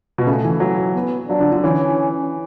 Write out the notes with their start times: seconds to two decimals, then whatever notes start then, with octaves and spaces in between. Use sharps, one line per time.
0.18 B2
0.27 C#3 A3
0.44 E3
0.60 F#3
0.95 B3
1.29 F#3 D4
1.40 D3
1.52 D3
1.63 E3 C#4